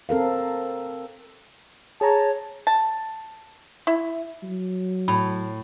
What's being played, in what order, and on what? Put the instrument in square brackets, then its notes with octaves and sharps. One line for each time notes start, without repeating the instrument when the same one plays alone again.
[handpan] C4 A4 A#4 F5
[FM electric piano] G#4 A#5 [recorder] C#5 [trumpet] A5
[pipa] A5
E4
[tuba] F#3
[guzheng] A2 [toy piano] B5